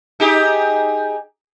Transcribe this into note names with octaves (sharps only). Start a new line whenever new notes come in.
D#4 G4 G#4